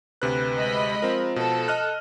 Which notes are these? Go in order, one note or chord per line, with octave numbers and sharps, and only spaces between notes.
D2 C3 B4 F#6
G#3 D#5 B5
F3 C4 A#4
B2 A4
D#5 F6 F#6